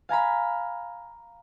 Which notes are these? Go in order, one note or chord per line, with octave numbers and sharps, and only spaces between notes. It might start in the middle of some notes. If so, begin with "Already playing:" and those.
F5 G#5 A#5 B5